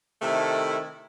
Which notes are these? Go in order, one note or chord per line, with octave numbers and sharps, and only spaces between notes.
C3 D#3 A3 E4 A4